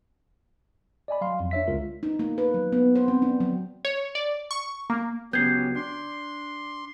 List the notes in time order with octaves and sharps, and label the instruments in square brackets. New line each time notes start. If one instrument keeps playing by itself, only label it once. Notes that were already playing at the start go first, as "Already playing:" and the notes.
[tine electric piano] D5 D#5 G#5 B5
F#3 F5 C6
F2
D4 C#5 E5 B6
C#2 G#3 F4 A#4
[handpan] D#4
A#3
B4
F#3
B3
C5
C4
D4
F#3
[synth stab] C#5
D5
C#6
A#3
[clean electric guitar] C#2 B3 [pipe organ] F#3 C#4 G4 [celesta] G6 G#6 C7
[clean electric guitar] D4 [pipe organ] C6